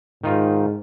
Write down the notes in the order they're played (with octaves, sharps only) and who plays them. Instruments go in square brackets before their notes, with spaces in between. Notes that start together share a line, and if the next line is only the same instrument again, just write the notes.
[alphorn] G#2 [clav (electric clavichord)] D#3 D#4 F4